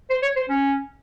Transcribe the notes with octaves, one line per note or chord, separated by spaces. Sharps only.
C5
C#5
C5
C#4